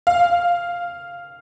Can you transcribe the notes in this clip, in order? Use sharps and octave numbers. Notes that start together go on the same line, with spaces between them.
F5